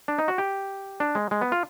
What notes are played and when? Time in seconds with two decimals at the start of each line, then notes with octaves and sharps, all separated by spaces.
0.08 D4
0.19 D#4
0.28 F#4
0.38 G4
1.00 D4
1.15 G#3
1.31 G#3
1.41 B3
1.52 F4